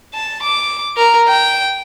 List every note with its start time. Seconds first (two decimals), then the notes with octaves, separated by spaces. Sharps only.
0.14 A5
0.43 D6
0.97 A#4
1.29 G5